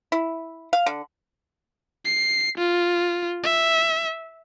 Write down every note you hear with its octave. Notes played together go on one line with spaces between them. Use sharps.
E4
F5
D3
C7
F4
E5